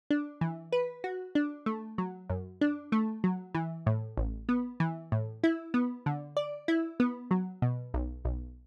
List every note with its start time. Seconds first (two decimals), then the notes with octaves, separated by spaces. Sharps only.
0.10 D4
0.41 E3
0.72 B4
1.04 F#4
1.35 D4
1.66 A3
1.98 F#3
2.30 F#2
2.61 D4
2.92 A3
3.24 F#3
3.55 E3
3.86 A2
4.17 A1
4.49 B3
4.80 E3
5.12 A2
5.44 E4
5.74 B3
6.06 D3
6.37 D5
6.68 E4
7.00 B3
7.31 F#3
7.62 B2
7.94 B1
8.25 B1